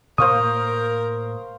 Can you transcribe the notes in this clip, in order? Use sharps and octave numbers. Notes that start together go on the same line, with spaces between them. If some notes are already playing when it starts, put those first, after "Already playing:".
A2 A#3 A#4 C5 F5 C#6 D#6